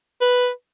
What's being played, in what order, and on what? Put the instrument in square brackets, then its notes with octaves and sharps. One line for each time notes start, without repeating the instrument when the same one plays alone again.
[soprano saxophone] B4